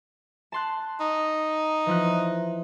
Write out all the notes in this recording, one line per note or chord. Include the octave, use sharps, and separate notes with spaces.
A5 C6 F#6
D#4
E3 F3 F#6